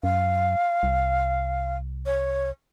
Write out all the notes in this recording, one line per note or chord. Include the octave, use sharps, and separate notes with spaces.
F#2 F5
C2
C#5